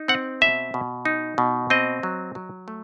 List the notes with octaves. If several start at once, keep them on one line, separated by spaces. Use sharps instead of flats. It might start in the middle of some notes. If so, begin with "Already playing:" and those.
Already playing: D#4
C4 F#5
B2 E5
B2
D#4
B2
C4 D#5
F#3
F#3
A3